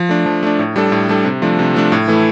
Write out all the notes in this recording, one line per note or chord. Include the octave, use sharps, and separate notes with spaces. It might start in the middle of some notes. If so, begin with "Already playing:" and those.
Already playing: F3
A3 D4
F3
A3 D4
A2
G3 D4 A4
A2
G3 D4 A4
C3
F3 A3 D4
C3
F3 A3 D4
A2
E3 A3 E4